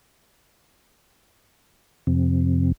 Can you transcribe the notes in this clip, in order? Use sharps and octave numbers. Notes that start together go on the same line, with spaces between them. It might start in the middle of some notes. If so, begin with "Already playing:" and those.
F2 C3